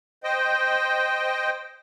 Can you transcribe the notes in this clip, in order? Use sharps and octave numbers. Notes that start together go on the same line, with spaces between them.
C5 D#5 G5